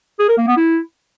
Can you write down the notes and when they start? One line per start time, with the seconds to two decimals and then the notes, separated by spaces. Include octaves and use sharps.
0.19 G#4
0.29 A#4
0.38 A#3
0.47 B3
0.57 E4